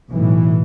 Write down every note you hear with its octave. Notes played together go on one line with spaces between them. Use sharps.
B1 A2 E3